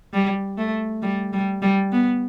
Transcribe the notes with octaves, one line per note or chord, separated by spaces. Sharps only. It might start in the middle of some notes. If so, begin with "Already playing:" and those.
G3
A3
G3
G3
G3
B3